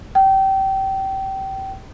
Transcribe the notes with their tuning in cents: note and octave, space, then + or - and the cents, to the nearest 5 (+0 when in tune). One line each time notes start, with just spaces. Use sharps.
G5 -25